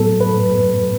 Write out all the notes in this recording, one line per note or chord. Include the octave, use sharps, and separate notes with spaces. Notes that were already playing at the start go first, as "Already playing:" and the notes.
Already playing: A2 F#3 B3 A4
B4